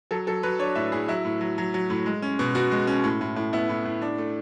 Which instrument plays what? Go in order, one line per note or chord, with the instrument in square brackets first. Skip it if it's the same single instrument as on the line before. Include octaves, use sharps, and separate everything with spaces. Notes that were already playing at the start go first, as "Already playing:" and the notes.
[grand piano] F#3 A4
F#3 A4
F#3 B4
D4 C#5
A2 E5
A2 G#4
F#3 E4
A2
F#3
F#3
F#3
A2
G#3
C#4
B2
B2 F#4
G#3
C#4
A2
A2
A2
B3 E4
A2
A2
D4
A3